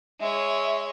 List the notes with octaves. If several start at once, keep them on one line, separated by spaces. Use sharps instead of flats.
G#3 C#5 E5